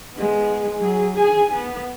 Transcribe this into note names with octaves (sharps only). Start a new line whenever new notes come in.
G#3 B3
F#3 G#4
G#4 G#5
B3